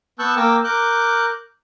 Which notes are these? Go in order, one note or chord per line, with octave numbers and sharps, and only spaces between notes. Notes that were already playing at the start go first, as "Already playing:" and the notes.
B3 A5 C#6 E6 F#6 G6
A#3 A#4 G5 D6 E6
A#4 D6 F#6 G6